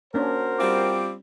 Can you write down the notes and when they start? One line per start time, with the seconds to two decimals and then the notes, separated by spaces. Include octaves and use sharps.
0.14 A#3 C#4 D4 F#4 A#4 C5
0.59 G3 C4 F4 D6